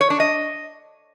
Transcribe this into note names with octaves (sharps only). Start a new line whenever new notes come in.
C#5
D4
D#5